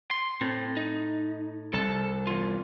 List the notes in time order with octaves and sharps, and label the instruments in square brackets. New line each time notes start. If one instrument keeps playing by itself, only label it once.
[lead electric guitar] C6
[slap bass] A2 [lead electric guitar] C4
[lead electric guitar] D#4
[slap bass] C2 [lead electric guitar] A4 A5
[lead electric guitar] E2 F4